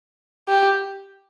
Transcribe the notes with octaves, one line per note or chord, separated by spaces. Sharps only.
G4